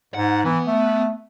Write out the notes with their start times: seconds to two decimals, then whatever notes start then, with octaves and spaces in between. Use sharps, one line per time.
0.14 G#2 F#5
0.45 E3 B3
0.67 A3